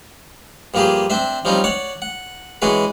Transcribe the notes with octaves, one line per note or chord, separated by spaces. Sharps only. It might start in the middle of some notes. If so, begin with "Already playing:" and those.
G2 F3 A#3 F4 G4 G#4
C4 D4 C5 E5
F3 G3 C4 C#4 D#4 F4
C#5 D5 F#5
F#5
E3 G#3 C#4 F#4 G#4 B4